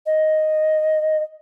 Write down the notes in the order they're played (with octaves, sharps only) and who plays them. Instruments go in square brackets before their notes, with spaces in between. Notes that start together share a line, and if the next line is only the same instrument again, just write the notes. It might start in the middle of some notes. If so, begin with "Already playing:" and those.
[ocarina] D#5